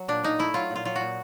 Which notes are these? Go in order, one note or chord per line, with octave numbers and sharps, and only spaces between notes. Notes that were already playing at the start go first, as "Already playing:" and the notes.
Already playing: F#3
A#2 D4
A#2 D#4
A3 E4
F#3 F4
A#2 F4
F#3 F4
F#4
A#2